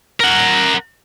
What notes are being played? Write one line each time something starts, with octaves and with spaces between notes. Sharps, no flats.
A#4 F#5